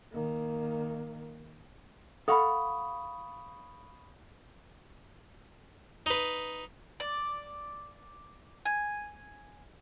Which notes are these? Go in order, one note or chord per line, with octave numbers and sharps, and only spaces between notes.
D#3 A#3
A4 F5 F#5 B5 C#6 D#6
D#4 B4
D5
G#5